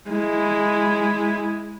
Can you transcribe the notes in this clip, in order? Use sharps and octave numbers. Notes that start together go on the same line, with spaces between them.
G#3 E4